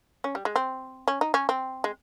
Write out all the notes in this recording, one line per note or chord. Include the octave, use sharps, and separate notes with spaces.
C#4
G3
G#3
C4
C#4
D#4
C#4
C4
G#3